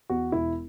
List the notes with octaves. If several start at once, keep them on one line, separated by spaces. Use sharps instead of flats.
E2 F#4
E1 E4